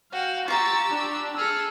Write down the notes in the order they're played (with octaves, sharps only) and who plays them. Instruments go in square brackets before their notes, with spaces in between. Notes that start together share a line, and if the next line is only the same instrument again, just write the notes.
[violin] F#4 [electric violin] F5 G5
[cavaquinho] F4 A#5 [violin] G4 E6 [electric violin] C#6 A6
[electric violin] D4
[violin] G#4 A4 [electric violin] E6 F6